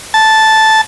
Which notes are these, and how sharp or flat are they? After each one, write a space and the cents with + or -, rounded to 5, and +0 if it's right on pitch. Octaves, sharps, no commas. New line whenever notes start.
A5 -5